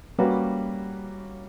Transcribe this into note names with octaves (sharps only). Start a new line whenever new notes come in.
G3 A#3 C#4 F#4 B4